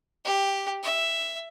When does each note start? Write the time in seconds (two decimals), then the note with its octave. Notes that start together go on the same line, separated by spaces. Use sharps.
0.25 G4
0.83 E5